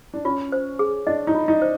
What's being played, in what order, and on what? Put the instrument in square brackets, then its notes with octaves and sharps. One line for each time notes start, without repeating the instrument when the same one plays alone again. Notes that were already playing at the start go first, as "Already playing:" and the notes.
[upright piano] D4
[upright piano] C#4 [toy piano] F4
[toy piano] C5
G#4
[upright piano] D4 [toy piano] D#5
[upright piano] D#4
[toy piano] F4
[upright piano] D#4
[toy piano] C5